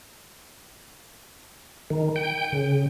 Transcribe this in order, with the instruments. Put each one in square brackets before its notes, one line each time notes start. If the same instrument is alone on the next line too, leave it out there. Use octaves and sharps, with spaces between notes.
[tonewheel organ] D#3
G5
C#3